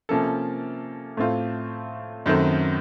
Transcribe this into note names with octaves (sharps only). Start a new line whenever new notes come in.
C3 F3 A#3 C#4 A4
A2 A3 C4 F4
F#2 D#3 A3 C4